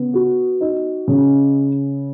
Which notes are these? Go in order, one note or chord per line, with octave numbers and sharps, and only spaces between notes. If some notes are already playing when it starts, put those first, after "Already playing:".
Already playing: C#3 B3
F#4
D#4
C#3